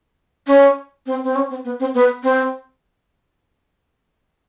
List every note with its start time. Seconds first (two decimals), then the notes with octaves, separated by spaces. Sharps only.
0.47 C#4
1.06 C4
1.24 C4
1.35 C#4
1.50 C4
1.64 B3
1.80 C4
1.94 B3
2.23 C4